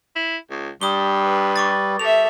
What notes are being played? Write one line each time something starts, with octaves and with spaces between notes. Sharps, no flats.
E4
C#2
G2 G3 D#6 G7
B4
C#6 D6 A6
G3 A4 E5 F7